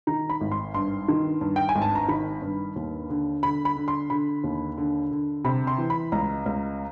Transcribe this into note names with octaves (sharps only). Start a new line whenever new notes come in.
D#3 A#5
B5
G#1
C6
G2 C6
D#3
G2
G5
G#5
G#1
A5
A#5
D#3 B5
G2
D#2
D3
D3 B5
B5
D3
C6
D3 B5
D#2
D3
D3
C3 B5
C6
E3
B5
C#2 A#5
C#2